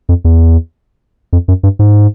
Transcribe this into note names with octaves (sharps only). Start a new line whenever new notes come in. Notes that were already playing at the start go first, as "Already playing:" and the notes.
F2
E2
F2
F#2
G2
G#2